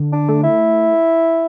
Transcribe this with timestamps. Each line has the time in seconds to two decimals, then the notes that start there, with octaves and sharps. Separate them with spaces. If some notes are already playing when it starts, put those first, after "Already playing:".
Already playing: D3
0.13 D4
0.29 A3
0.43 E4